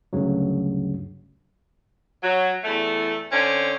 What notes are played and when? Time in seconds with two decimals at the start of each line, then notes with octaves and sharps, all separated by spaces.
0.13 D2 G2 C#3 F#3
2.23 F#3
2.64 E2 A3
3.32 D3 C4 C#4